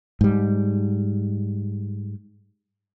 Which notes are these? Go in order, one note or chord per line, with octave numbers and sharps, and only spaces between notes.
G#2 G3